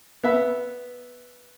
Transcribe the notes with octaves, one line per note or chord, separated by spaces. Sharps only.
B3 E5